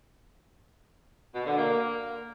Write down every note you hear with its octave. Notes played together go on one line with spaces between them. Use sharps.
B2
D3
A#3